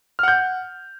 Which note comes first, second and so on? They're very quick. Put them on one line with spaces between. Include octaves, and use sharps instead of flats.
F6 F#5 G6